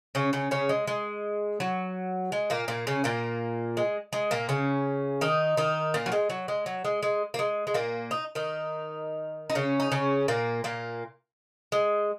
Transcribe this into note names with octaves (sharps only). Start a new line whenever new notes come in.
C#3 C#4
C#3 C#4
C#3 C#4
G#3
G#3
F#3
G#3
A#2 A#3
A#2 A#3
C#3 C#4
A#2 A#3
G#3
G#3
A#2 A#3
C#3 C#4
D#3 D#4
D#3 D#4
A#2 A#3
F#3
G#3
F#3
G#3
F#3
G#3
G#3
A#3
G#3
G#3
A#2 A#3
D#4
D#3 D#4
D#4
C#3 C#4
D#4
C#3 C#4
A#2 A#3
A#2 A#3
G#3